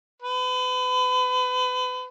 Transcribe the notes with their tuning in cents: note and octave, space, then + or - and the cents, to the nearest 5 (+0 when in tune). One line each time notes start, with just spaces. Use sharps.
B4 +35